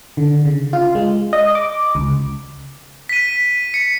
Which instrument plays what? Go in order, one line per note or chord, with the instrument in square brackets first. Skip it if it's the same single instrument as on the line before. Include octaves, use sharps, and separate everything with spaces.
[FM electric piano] D3
C#3
F4
G#3
D#5
D6
C#2
[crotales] B6 D#7
C#7